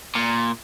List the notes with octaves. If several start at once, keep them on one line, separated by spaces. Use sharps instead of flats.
A#2